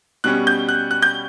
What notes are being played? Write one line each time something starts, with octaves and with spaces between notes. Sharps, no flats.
B2 G3 C#4 F#6
G6
F#6
F#6
G6